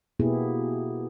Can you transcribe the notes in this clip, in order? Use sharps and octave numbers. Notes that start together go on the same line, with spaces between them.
B2 A#3 B3 E4 G4 G#4